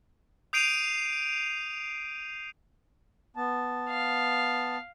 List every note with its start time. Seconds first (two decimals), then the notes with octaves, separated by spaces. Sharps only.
0.53 D#6 G6 C7 D7 D#7 F7
3.36 B3 A5
3.90 F5